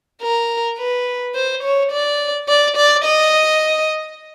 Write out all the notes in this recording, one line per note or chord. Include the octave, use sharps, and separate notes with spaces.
A#4
B4
C5
C#5
D5
D5
D5
D#5